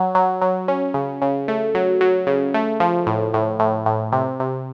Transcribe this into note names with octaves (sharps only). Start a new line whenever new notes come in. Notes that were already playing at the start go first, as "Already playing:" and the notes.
Already playing: F#3 F#4
F#3
F#3
C#4
C#3
C#3
A3
F#3
F#3
C#3
A3
F3
A2
A2
A2
A2
C3
C3